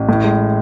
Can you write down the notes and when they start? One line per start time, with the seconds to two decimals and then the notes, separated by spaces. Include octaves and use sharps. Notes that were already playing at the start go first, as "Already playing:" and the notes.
Already playing: A1
0.09 A2
0.24 G#3